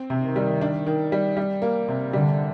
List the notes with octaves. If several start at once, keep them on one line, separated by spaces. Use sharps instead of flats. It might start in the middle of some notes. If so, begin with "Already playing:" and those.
Already playing: C4
C3
D#3
G3
D4
D#3
G3
G3
A#3
C3
D3 G3